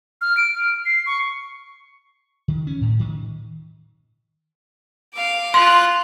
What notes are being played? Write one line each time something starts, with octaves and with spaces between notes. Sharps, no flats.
F6
D7
F6
C7
C#6
D#3
C#4
A2
D#3
F5 D6
F4 C6 F#6